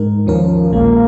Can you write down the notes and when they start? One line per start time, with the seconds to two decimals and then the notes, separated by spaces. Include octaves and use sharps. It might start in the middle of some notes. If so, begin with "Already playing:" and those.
Already playing: G#2 G#3 D#4 A#4
0.27 D#2 D#3 F3 C#4 A#4
0.72 A#1 A#2 G#3 A#3